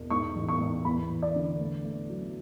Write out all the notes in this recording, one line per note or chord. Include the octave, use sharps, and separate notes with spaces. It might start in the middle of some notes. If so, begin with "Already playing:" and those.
Already playing: E1
G#2 C#6
A1
C#6
G#2
E2 B5
E2
D5
D3
A3
A3
F#3